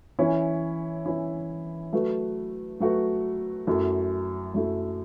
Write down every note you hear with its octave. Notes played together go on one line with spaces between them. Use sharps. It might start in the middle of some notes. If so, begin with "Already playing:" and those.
E3 C#4 E4
E3 C#4 E4
F#3 A3 F#4 B4
F#3 A3 F#4 B4
F#2 F#3 A3 E4
F#2 F#3 A3 E4